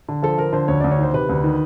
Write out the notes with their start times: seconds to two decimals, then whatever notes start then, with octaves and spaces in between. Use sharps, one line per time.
0.09 D3
0.22 F3 A4
0.38 F3 A#4
0.53 D3 C5
0.68 D2 C#5
0.80 D2 D5
0.91 C#5
0.99 D#3 C5
1.13 C3 B4
1.29 D2
1.44 D#3